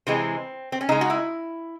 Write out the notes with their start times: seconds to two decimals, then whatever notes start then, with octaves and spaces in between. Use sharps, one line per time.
0.07 C3 E3 G#3 C4
0.72 C4
0.81 C#4
0.89 C#3 G#3 D#4
1.01 F#4
1.10 E4